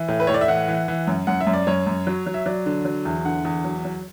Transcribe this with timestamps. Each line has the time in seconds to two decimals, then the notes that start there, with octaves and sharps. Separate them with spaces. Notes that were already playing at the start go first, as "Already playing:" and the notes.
Already playing: E3
0.08 A2
0.20 B4
0.27 A2 C#5
0.34 D5
0.41 E5
0.48 E3 F#5
0.68 E3
0.88 E3
1.07 F#2
1.27 F#2 F#5
1.41 E5
1.47 F#2
1.54 D5
1.67 F#2 C#5
1.87 F#2
2.07 F#3
2.26 F#3
2.34 E5
2.46 F#3 D5
2.66 D3
2.85 F#3
3.05 E2
3.25 D3 F#5
3.45 E2
3.64 F#3
3.85 F#3